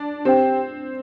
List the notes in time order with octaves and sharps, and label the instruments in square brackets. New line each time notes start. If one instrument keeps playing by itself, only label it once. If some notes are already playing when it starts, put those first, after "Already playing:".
Already playing: [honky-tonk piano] D4
[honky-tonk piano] C4 [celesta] G4 C5 G5